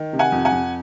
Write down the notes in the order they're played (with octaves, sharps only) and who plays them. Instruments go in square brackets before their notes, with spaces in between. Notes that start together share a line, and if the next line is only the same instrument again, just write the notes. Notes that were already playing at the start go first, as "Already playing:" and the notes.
Already playing: [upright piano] D#3
C3
F#5 G#5
F2
F#5 G#5
F2